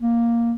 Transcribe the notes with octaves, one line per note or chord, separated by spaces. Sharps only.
A#3